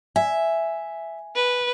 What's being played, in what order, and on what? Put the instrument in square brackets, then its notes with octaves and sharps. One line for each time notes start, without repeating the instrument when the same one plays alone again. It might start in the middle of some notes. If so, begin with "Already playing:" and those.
[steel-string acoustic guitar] E5 [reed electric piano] G#5
[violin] B4